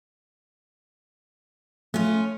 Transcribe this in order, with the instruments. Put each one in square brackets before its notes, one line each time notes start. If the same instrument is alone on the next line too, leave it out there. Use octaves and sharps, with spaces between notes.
[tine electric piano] A3 [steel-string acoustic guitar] C#4 F4